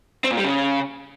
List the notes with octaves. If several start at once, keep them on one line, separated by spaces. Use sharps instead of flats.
C4
A#2
G3
C#3